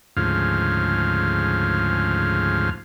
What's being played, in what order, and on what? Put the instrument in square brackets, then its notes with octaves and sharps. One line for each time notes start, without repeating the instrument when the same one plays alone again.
[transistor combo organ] D2 G#2 C#3 F3 F5